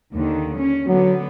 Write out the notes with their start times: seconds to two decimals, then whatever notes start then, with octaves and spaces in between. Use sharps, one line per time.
0.14 D#2 D3 D#3
0.58 C#4
0.87 D3 F#3 B3